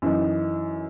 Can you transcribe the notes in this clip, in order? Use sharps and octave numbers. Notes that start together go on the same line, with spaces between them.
F#2 E3 D#4